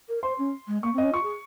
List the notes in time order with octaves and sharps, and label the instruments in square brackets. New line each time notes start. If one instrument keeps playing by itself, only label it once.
[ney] A#4
[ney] C5 [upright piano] C6
[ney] C#4
G#3
[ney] A#3 [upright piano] C#6
[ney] C4
[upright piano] D#5
[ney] C#4
[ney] F4 [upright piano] C#6
[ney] G#4